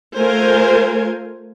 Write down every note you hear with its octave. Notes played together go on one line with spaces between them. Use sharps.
A3 F4 A#4 C5 G#5